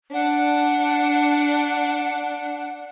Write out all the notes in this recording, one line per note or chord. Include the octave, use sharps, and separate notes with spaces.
D4 F#5